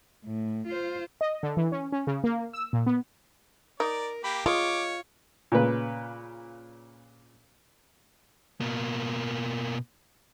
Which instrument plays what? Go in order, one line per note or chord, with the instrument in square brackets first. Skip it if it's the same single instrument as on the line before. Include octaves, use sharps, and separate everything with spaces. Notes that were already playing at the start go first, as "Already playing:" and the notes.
[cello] A2
F4 C5
[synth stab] D#5
D3
E3
C#4
C#4
C#3
A#3
E6
A#2
B3
[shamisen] D#4 [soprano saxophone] A#4 [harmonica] D5
[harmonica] A#3 G4 [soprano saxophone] B5
[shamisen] G#3 [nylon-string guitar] F4 [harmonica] C#5 [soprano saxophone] D6
[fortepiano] A#2 C#3 B4
[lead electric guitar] B2 A#3